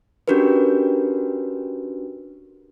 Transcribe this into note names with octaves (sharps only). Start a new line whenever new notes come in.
C#4 D4 F#4 G4 A#4 B4